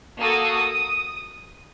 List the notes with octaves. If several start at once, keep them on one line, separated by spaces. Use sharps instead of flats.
A#3 F#4 A4 D#6